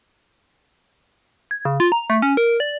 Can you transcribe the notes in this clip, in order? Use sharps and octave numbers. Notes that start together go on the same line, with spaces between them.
G#6
C#3
F4
A#5
A3
C#4
A#4
D5